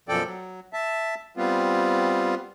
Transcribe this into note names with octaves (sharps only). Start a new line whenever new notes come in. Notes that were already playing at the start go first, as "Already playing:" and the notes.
F#2 B2 F3 A4 D5 G5
F#3
E5 A5
G3 B3 C4 F4